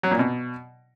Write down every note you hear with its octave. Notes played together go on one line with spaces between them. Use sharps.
F#3
A#2
B2